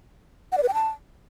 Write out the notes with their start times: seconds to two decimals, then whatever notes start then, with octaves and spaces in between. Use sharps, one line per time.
0.52 F#5
0.58 D5
0.63 B4
0.68 G5
0.74 A5